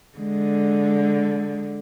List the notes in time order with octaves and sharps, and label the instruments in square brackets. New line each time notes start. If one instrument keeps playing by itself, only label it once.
[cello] D3 G#3